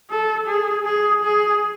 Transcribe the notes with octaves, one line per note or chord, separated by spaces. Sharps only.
A4
G#4
G#4
G#4